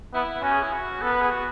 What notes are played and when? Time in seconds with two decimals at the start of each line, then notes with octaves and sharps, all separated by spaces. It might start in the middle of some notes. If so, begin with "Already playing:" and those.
0.13 B3 E4
0.42 C#4 F#4
0.53 G#4
0.62 E4
0.73 F#4
1.01 B3 A4
1.11 B4
1.21 G#4
1.31 F#4